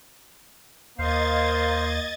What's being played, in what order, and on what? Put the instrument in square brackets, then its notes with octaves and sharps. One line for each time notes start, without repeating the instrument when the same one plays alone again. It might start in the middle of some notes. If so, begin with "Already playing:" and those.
[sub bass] D#2 [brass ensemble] A#3 [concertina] C5 F5 [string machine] D#5 G#6 A6